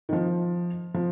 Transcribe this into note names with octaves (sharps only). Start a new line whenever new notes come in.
D#3
F3
F3